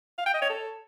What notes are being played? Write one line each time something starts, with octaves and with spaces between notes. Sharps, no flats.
F5
G5
D#5
C#5
A4